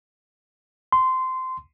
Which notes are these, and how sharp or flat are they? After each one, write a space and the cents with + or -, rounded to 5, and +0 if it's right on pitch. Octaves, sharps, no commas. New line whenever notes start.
C6 -15